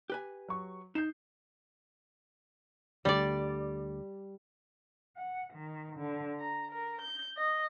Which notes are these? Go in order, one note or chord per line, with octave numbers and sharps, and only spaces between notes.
G4 B4 G#5
F#3 C#6
D#4 G6 C7 E7
D2 D3 G3 A3 D5
F#5
D#3
D3
A#5
A#4
G6
D#5